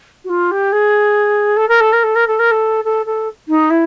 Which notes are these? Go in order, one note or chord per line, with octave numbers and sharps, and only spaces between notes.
F#4
F4
G4
G#4
A4
A#4
A4
A#4
A4
A#4
A4
A#4
A4
A4
A4
D#4
E4